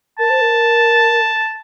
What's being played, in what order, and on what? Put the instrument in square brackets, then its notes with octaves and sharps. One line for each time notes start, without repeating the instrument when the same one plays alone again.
[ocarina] A#4 [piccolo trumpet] A5
[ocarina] C5
A#4